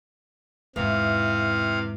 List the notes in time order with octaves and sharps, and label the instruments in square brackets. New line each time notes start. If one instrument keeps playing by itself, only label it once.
[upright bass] E2 G#2 [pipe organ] C3 F5 [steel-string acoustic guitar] E3